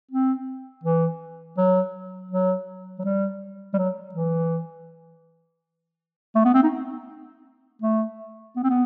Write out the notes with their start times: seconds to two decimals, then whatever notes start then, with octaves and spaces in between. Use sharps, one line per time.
0.11 C4
0.84 E3
1.58 F#3
2.31 F#3
2.99 F#3
3.04 G3
3.74 G3
3.78 F#3
4.15 E3
6.35 A3
6.45 B3
6.54 C4
6.63 D#4
7.82 A3
8.56 B3
8.63 C4
8.70 B3